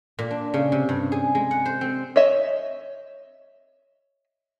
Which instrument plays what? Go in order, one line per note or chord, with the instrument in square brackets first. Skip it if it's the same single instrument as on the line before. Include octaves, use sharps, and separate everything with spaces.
[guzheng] A#2
D4
C#3
C3
G2
G#4
G#3
F#5
C5
C4
[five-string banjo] C#5 D#5 E5